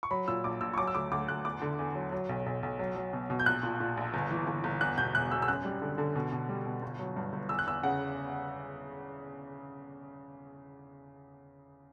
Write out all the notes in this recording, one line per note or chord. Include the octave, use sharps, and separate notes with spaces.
C#6
F#3 B5
A#2 E6
A#1 D6
A#1 E6
C#6
F#3 D6
E6
D2 D6
D2 D6
D2 F#6
E2 D6
D3
E2
F#3
F#3
B1
B1
B1
F#3
F#3
B2
B2
G6
A#1 F#6
A#2
A#2
A#1
G1
E3
G1
G1
E2 F#6
B2 G6
E1 F#6
E1 E6
E6
F#2 F#6
G3
D3
D3
B2
B2
G3
B2
G1
F#3
G2
G1
E2 E6
F#6
E2 E6
C#3 F#5